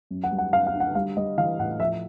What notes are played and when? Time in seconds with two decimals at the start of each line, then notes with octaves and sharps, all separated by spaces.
0.11 F#2
0.24 F#5
0.31 G3
0.38 F#5
0.53 F#2 F5
0.67 F5
0.74 D3
0.80 F#5
0.95 G3 F5
1.17 G3 D#5
1.38 E3 F5
1.59 A2 F#5
1.80 F3 E5